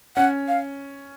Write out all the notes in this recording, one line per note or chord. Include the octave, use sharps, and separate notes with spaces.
C#4 F#5
F5